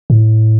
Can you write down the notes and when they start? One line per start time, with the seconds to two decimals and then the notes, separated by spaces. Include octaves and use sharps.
0.10 A2